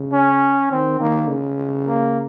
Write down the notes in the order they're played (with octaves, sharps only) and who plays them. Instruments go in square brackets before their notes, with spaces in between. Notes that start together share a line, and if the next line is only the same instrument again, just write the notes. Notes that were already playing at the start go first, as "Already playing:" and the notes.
Already playing: [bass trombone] C#3
[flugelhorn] C#4
[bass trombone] D#3 [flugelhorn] C4
[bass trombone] D#3 [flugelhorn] A#3
[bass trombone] C#3
[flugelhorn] A#3